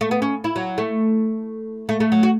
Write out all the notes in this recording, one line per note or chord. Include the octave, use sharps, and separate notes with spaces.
A3
B3
C#4
E4
F#3
A3
A3
A3
F#3
F#4